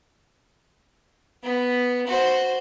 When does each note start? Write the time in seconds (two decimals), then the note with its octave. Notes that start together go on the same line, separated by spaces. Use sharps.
1.43 B3
2.07 F#4 C5